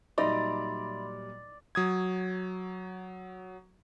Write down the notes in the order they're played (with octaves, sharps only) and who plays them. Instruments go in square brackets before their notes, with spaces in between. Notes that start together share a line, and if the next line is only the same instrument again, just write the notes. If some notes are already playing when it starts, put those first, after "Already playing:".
[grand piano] A#2 F#3 G3 [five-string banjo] D#4 [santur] D5 [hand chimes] E5 B5 C6
[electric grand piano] F#3 D#6 G#6